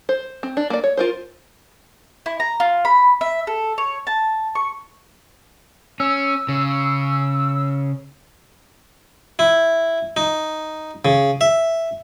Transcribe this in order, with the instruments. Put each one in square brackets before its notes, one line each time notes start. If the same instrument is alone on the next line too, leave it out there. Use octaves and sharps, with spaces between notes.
[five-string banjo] C5
C4
D4
A#3 D5
C#5
F4 A#4 C5
[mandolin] E4
A#5
F4
B5
E5
A4
C#5
A5
C#6
[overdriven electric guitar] C#4 [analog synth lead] E6
[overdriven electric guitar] C#3
[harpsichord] E4
D#4
C#3
E5